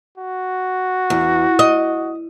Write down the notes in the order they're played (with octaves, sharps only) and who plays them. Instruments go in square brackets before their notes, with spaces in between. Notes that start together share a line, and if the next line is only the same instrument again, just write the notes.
[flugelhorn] F#4
[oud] E2
D#5